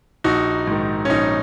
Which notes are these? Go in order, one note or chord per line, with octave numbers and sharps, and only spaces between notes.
A#1 D#4 F#4
G#2 D#3
C#4
A#1 D#4